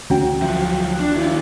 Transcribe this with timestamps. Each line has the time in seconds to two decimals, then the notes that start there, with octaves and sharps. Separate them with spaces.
0.10 D2 E3 C#4 F#4 G5
0.42 F3 F#3 E5
1.00 D4
1.16 D#3 E4 F4